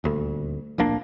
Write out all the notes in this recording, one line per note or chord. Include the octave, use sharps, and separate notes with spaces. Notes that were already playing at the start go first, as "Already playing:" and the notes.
D#1 D2
D1 A#1 A#3 D4